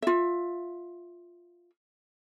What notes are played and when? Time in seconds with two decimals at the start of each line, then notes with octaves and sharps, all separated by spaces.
0.02 F4 E5